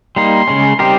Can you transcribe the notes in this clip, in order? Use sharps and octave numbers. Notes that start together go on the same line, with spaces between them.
G3 A#3 D#4 C6
C#3 G#3 C#4
G3 C4 D#4 G4 A#4 C6